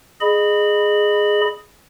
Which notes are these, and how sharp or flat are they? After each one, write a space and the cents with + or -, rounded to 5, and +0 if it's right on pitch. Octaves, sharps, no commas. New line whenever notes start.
G#4 +0 D#5 -30 B5 +0